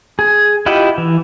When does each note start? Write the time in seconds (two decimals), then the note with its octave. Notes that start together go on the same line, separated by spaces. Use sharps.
0.19 G#4
0.66 E4 F4 G4 D#5 F#5
0.98 E3